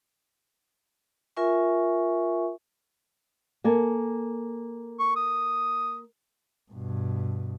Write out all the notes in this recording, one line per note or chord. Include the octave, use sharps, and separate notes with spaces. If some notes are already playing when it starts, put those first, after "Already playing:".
F4 A#4 E5 G#5 C#6
A#3 A4 G#5
C#6
D#6
G2 B2